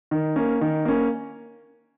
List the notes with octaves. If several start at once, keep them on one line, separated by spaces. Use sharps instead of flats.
D#3
A#3 C#4
D#3
A#3 C#4